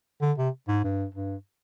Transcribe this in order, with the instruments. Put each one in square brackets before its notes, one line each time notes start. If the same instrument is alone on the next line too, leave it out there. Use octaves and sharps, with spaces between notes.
[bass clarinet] D3
C3
G#2
G2
G2